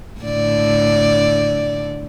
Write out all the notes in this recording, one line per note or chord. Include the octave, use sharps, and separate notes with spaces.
A2 D3 D5